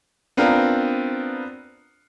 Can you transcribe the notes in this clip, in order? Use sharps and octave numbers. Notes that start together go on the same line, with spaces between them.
B3 C4 D4 F4 A#4